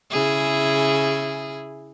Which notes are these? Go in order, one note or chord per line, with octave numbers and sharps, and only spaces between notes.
C#3 E4 G#4